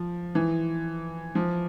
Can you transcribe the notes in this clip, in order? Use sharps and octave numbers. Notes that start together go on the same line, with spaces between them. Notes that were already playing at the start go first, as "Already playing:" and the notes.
Already playing: F3
E3
F3